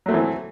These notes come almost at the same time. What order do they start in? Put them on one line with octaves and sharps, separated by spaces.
F#3 A3 C4 E3